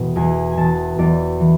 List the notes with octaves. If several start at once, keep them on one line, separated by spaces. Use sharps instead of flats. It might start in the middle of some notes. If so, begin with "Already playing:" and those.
Already playing: E1 B2
E2 G#5
G#5
E1 A5
E2 D5
E3